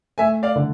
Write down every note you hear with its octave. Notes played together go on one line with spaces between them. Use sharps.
A3 E5 G#5
D5 F5
D3